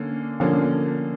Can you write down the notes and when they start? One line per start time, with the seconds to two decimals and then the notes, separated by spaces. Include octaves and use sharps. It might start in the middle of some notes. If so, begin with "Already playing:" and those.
Already playing: D3 A#3 C#4
0.40 D3 F3 A#3 C#4